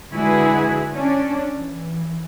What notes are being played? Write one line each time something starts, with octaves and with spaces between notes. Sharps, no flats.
D3 G#3 E4 F#4 G#4 B4
C#4 D4
E3